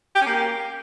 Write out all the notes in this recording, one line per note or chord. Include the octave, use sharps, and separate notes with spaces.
G4
C#4
A#3